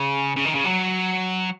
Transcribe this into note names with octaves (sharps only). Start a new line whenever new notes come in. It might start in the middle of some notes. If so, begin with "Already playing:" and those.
Already playing: C#3
C#3
D#3
C#3
F#3